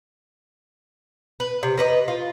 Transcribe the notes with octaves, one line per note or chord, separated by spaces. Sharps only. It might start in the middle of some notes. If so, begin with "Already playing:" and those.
B4
C3
A#4 B4 C#5 D#5
F4